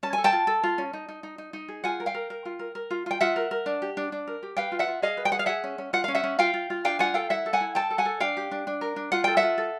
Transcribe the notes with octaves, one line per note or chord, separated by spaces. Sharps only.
C#4 A5
G#5
A4
G5 A5
F4
A4
F4
C#4
D#4
D#4
D#4
D#4
D#4
G#4
F4 F#5 G#5
A#4
F5 G5
A#4
A#4
F4
A#4
A#4
F4
F4 G5
F4 E5 F#5
A#4
A#4
D4
G4
D4
D4
A#4
G4
B4 F5 G5
F4
E5 F#5
F4
G#4 D#5 F5
B4
G5
G#4 F#5
F5
G#4 E5 F#5
C#4
C#4
F4 F#5
C#4 F5
E5 F#5
C#4
F4 F5 G5
F4
F4
D4 F5 G5
F4 F#5 G#5
A4 F5 G5
E4 E5 F#5
A4
F#5 G#5
E4
A4 G5 A5
A4
F#5 G#5
A4
D4 F5 G5
G4
D4
D4
A#4
D4
F4 F#5
A4 G5
E5 F#5
F4
A4